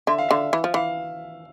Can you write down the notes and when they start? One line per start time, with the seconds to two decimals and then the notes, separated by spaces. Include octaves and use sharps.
0.07 D3 E5
0.18 F5
0.29 D3 E5
0.53 E3
0.64 F3
0.74 E3 F5